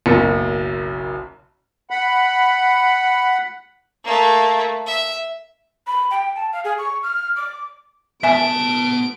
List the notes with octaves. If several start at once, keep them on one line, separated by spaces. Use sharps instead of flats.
F#1 B1 F#2 C#7
F#5 B5
A3 A#3
E5
B5
G5
A5
F5
G#4
C#6
F6
D6
B3 E5 G#5 A5 D7